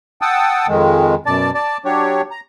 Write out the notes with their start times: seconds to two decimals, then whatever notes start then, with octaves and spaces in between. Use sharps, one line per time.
0.22 F#5 G5 A5 D#6 E6
0.68 F2 D#3 G#3
1.26 F#2 B2 D5 A5
1.55 D5 A5
1.85 F#3 D4 G4 C#5
2.31 A#5